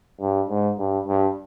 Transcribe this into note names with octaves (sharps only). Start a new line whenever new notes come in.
G2
G#2
G2
G2